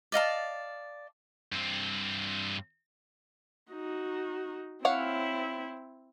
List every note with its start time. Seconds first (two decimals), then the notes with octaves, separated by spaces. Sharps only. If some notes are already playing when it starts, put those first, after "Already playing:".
0.12 D5 D#5 F5 A5
1.52 G2 C4
3.72 D#4 F#4
4.85 C4 E4 C#5 F5 F#5